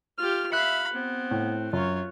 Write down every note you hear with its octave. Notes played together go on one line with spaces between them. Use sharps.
F4 G4 F6
E5 F5 B5 F#6 C#7
B3 C4
A2
F#2 F4 F#4 C#5